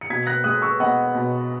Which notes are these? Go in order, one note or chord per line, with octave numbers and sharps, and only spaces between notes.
C#7
B2 G#6 B6
F#6 A#6
G#3 D#6 F#6
C#6 E6
B3 D#5 F#5
B2